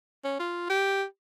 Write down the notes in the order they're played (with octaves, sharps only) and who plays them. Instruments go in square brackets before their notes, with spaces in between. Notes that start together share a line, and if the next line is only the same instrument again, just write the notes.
[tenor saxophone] C#4
F4
G4